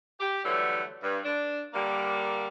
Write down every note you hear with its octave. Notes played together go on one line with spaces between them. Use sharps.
G4
D3 E3 F#3 G3 A3
G2
D4
D3 G3 A#3